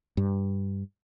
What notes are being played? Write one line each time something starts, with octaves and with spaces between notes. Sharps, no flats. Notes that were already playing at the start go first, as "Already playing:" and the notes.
G2